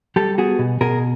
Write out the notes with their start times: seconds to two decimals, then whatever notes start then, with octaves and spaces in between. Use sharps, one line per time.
0.16 G3 G4 A4
0.38 B3 F#4 G#4
0.59 B2
0.81 B2 G#4 A#4